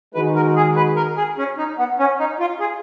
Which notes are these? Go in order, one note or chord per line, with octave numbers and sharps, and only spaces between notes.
D#3 G#3 D#4 F#4 B4
A#4
G#4
B4
A#4
G#4
C#4
D#4
B3
C#4
D#4
F4
G#4